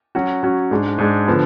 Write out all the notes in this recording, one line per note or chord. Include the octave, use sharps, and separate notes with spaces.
F#3 C#4 F#4
F#3 C#4 F#4
G#2 G#3 D4
G#2 G#3 D4
D3 F3 B3